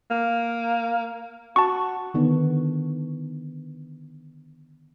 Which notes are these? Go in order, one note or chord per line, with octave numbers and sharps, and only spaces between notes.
A#3
F#4 A5 C#6
D3 D#3 B3